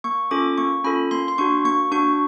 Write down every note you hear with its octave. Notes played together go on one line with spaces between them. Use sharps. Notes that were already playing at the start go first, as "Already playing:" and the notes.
A#3 C#6
C#4 F4 A4 D6
A#3 C#6
C#4 F4 A4 B5
A#3 C6
C6
D4 F#4 C#6
A#3 C#6
D4 F#4 C#6